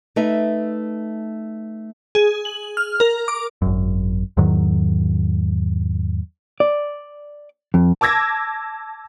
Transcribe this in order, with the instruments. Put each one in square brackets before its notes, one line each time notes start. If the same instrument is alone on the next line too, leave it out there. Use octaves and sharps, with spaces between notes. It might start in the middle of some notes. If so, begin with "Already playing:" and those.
[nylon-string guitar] A3 D#4 B4 E5
[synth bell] G#4
F#7
F6
A#4
D6
[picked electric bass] G#1 F#2
E2 G#2 D#3 F#3
[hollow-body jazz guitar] D5
F2
[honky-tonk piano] A5 D6 E6 G#6 A#6